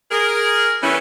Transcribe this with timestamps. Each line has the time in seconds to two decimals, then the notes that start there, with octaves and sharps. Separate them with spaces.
0.11 G#4 A#4
0.83 E3 G3 A3 B3 C#4 E4